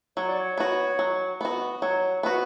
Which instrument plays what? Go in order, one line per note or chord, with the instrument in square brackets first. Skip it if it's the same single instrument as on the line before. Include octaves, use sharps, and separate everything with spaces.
[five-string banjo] F#3 [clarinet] C#5
[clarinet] D5
C#5
[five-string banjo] B3 F#4
F#3
B3 F#4
[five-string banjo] F#3 [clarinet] C#5
[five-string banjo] B3 F#4 [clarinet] B4